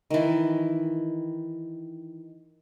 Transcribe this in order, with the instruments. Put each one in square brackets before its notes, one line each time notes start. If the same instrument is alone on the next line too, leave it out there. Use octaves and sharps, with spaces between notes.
[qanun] D#3 E3